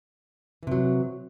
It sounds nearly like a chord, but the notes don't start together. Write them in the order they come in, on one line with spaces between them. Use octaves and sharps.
E3 C3 F#3